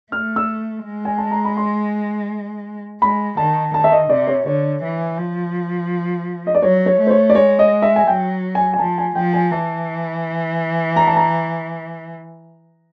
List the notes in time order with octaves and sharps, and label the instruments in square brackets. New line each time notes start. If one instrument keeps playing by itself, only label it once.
[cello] A3 [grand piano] F6
[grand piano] E6
[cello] G#3
[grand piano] G#5
A5
A#5
B5
C6
[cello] G#3 [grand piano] B5
[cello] D#3 [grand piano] A5
[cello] D#3 [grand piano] A5
[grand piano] E5
D#5
[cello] C3 [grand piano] D5
[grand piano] C#5
[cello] D3 [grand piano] C#5
[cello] E3
F3
[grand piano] D#5
D5
[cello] F#3 [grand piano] C#5
[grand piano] C#5
[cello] A3
[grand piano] C5
C#5
D5
[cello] G#3 [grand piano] C#5
[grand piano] D#5
E5
G#5
[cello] F#3 [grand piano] G5
[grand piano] G#5
G#5
[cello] F3 [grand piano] A5
[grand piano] G#5
[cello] F3 [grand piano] G5
[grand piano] G#5
[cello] E3 [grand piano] A5
[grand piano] A#5
A5
A#5